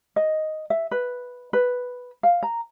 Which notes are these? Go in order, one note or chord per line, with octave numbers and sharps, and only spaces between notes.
D#5
E5
B4
B4
F5
A#5